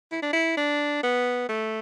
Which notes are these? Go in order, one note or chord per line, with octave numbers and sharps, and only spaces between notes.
E4
D4
E4
D4
B3
A3